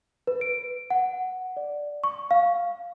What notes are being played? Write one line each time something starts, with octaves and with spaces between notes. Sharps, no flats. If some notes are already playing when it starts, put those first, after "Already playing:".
B4
D7
F#5
D5
C#6
F5